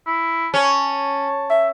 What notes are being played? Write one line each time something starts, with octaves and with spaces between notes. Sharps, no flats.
E4
C#4 A5
E5